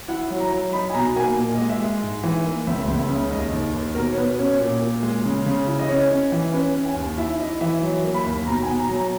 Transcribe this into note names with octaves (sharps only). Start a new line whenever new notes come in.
E4 F#5
F#3
A#5
F#3
D#4 B5
G#5
B2 A#5
A#3 G#5
A#2
D#5
G#3
E5
G#3
G#2
E3
A#3
C#2 E5
C#2
E5
C#3
D#2 D#5
D#2
D#2
B2 A#4
C#5
B2 B4
C#4 C#5
A#2
A#2
G#3
C#3
C#3
E4
D#5
C#4 C#5
C#4
E3
C#4 B4
C#4
G#5
D#2
E4 E5
E4 D#5
E3 E5
F#3
A#3
B5
D#2
B2 A#5
G#5
B2
A#5
F#3
A#5